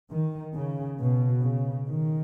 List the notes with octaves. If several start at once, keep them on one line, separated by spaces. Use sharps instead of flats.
D#3
C#3
B2
C#3
D#3